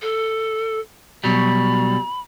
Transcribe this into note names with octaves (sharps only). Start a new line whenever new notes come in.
A4
B2 F#3 G3 B5